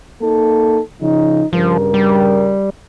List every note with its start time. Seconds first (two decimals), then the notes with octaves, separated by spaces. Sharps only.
0.21 A#3 D#4 A4
1.00 C#3 F3 D#4
1.53 G2 C#3 F3 A#4
1.94 G3